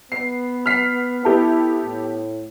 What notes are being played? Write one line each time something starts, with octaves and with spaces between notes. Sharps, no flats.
B3 C7
F6 B6 C7
B3 E4 G4 A4
A2